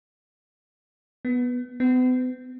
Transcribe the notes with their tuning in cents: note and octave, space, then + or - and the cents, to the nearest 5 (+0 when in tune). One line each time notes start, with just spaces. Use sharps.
B3 -5
B3 +40